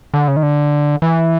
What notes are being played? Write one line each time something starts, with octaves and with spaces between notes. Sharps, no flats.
D3
C#3
D#3
D3
E3